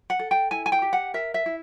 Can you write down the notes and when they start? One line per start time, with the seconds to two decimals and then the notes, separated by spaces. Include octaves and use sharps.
0.10 F#5
0.19 A4
0.31 G5
0.51 E4 G#5
0.66 G#5
0.72 G5
0.82 G4
0.93 F#5
1.14 A#4 E5
1.34 E5
1.46 E4